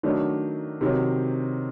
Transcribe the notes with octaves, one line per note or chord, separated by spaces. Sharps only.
D#3 F#3 A3 D4
C3 D#3 F#3